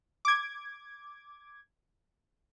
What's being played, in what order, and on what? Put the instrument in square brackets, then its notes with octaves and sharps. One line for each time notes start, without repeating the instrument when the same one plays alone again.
[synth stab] D6 G#6